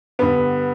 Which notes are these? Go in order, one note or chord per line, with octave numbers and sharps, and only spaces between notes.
G2 D3 B3